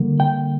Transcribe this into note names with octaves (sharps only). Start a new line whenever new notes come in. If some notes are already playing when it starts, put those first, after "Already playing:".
Already playing: D3 G3 A#3
G5